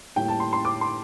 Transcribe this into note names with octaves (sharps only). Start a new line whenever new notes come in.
A2 G3 A#3 G5
A5
C6
C6
D6
C6